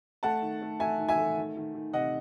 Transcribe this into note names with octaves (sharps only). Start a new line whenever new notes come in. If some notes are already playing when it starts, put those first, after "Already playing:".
A3 F#5 A5
D#3
A3
A3 E5 G#5
D#3
E5 G#5
A3
D#3
D#3
D#3
C3 D#5 F#5